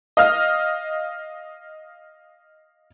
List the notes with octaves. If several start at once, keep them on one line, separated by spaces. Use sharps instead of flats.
D#5 F5 F6